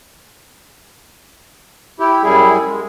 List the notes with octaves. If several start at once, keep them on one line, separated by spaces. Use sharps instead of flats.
E4 G4
F#2 G3 E4 G#4
G#3